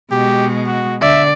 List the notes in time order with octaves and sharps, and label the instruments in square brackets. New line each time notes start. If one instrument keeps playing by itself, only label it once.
[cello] B2 G#3 [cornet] G4
[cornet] F#4
[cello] D3 [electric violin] D5 [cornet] E5